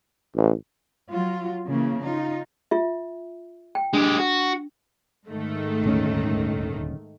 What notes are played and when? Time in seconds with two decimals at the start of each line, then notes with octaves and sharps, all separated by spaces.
0.36 A1
1.12 F#3 F4
1.67 C#3 E3 A#3
2.02 D#4 F4
2.71 F4 E5
3.75 G5
3.93 G#3 D4 G4
4.18 F#4
5.27 G#2 D#3 A3
5.84 D#1 D2 C#4